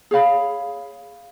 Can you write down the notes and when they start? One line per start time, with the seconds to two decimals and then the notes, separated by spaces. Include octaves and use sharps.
0.11 G#4 C#5 F5 B5